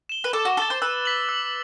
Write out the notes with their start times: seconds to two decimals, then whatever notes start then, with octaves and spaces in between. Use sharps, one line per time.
0.09 E7 G7
0.24 B4
0.33 A4 D6
0.45 F#4
0.57 A4 A6 E7 G7
0.70 C5
0.82 B4 E6
1.05 B6 F#7
1.29 E6